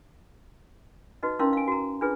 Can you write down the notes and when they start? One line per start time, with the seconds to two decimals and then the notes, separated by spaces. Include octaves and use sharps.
1.23 D#4 F#4 B4 D#5
1.39 C#4 D#4 E4 A#4 F5 C6
1.53 F5 G#5
1.68 F#4 A#5
2.01 D4 D#4 F4 G#4 B4